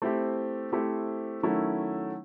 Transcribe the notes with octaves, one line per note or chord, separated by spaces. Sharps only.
A3 C4 E4 G4 C5
A3 C4 E4 G4 C5
D#3 F#3 A3 C#4 E4